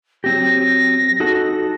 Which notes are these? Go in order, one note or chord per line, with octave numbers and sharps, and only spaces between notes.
F#3 C4 G4 A#6
D#4 F#4 A4